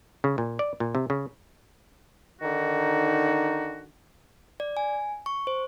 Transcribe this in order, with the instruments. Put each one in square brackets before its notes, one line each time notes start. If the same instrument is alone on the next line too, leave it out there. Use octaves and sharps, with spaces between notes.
[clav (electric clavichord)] C#3
A#2
D5
A#2
C3
C#3
[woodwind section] D3 D#3 D#4 F#4
[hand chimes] D5
G#5
C#6
C5